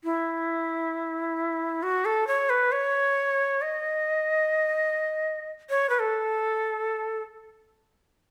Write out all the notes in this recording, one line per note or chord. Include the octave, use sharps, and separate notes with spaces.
E4
F#4
A4
C#5
B4
C#5
D#5
C#5
B4
A4